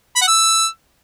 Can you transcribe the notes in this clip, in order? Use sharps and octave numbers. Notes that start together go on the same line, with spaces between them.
B5
F#5
E6